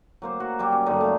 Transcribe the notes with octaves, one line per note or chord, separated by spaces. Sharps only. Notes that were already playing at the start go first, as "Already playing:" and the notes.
F#3 A#3 C5
F#3 F#4
F#3 G3 D6
C#4
G2 D3 F#3 D#4
A3 F5